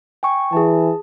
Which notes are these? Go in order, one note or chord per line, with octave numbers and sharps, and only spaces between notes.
G5 G#5 C#6
E3 G#4 A5